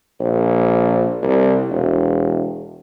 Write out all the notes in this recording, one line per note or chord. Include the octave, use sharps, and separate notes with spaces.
A#1
C2
E1